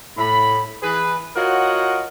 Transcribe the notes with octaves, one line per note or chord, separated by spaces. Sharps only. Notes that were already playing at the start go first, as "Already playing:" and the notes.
A2 B5
E3 G#4 B4
F4 F#4 A#4 C#5 D#5 F#5